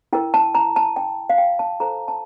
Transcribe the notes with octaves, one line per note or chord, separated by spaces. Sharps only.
E4 A#4 G5
A5
A#5
A5
G5
F5
G5
A5
F4 A4 C5 A#5
A5